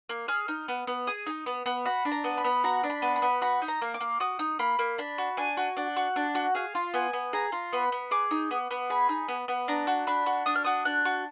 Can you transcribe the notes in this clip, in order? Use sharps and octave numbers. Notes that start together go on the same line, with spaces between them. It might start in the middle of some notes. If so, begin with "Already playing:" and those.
A#3
G#4 F6
D#4
B3
B3
G#4 D#6
D#4
B3
B3
F#4 B5
D4
A#5
B3
B5
B3
F#4 A#5
D4
B5
B3
B5
B3
F#4 B5
D#4
A#5
A#3
D6
A#3
F#4 D#6
D#4
A#3 B5
A#3
D4 B5
F#4
D4 G#5
F#4
D4 F#5
F#4
D4
F#4
G#4 F5
F4
B3 G#5
B3
G#4 A#5
F4
B3 B5
B3
G#4 D6
D#4
B3
B3
G#4 B5
D#4
B3
B3
D4 A#5
F#4
D4 B5
F#4
D4 D#6
F6
F#4 D#6
D4 F#6
F#4